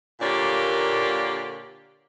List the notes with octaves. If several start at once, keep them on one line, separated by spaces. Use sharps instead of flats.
A#2 D3 A#3 G4 C#5 D5